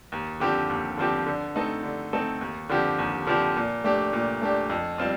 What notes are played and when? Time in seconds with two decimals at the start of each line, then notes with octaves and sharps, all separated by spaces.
0.12 D#2
0.40 D3 F3 C4 G4
0.69 D#2
0.97 D3 F3 C4 G4
1.26 D3
1.55 A3 C4 D#4 A4
1.83 D3
2.13 A3 C4 D#4 A4
2.41 D#2
2.69 D3 F3 C4 G4
2.98 D#2
3.27 D3 F3 C4 G4
3.56 A#2
3.84 A3 D4 G4
4.13 A#2
4.42 A3 D4 G4
4.70 F2
4.98 G3 C4 F4